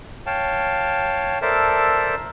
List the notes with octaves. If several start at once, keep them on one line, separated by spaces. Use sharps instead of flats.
C#5 F5 G5 A5
A4 A#4 C5 D5 E5 A5